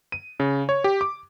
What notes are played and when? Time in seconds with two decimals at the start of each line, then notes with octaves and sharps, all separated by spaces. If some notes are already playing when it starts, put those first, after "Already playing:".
0.12 D#7
0.40 C#3
0.69 C#5
0.84 G4
1.01 D6